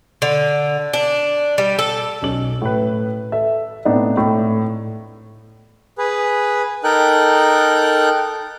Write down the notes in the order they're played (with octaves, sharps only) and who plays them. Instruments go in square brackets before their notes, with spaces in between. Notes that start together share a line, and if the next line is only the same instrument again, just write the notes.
[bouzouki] D3
D4
G3
A4
[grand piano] B1 C#4 F#7
A2 B4
A4 E5
A2 B3 C4 D4 D#4
A2
[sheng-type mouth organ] G#4 B4
D#4 A4 A#4 G5 F#6